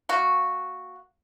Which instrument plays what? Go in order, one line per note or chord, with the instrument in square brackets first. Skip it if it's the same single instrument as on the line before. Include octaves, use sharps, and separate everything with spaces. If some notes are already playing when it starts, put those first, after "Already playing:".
[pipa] A#3 F#4